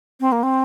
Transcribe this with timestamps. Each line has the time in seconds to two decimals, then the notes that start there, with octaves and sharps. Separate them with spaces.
0.20 C4
0.32 A#3
0.43 C4